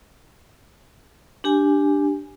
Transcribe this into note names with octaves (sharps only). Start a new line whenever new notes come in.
D4 G4 G#5